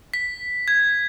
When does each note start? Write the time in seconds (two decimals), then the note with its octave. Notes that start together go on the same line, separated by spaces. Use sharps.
0.14 B6
0.68 G#6